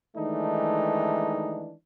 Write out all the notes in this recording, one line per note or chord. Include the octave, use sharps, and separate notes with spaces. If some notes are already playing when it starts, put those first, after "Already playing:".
D#3 E3 G#3 A3 D4 D#4